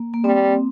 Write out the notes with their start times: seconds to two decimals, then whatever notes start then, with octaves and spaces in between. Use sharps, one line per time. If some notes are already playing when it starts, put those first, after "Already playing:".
Already playing: A#3
0.14 A#3
0.24 G3 C4